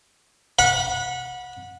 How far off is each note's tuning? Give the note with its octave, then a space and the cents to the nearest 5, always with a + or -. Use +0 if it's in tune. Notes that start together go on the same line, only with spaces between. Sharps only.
F#5 -25 B5 -20